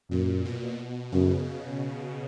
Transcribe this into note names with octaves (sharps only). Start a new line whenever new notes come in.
F#2 A#2
B2
F#2 C#3